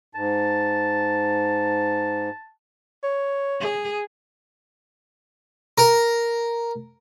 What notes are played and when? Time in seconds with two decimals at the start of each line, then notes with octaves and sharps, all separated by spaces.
0.15 G#2 A5
3.04 C#5
3.60 G#4
5.78 A#4